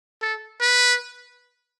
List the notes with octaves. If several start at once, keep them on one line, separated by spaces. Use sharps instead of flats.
A4
B4